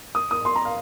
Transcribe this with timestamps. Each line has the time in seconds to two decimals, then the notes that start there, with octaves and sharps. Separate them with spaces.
0.15 D#6
0.31 D#6
0.45 C6
0.55 A#5
0.65 F5